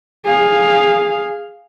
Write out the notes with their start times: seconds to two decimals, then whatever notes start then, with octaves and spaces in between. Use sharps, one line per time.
0.25 G#4 F5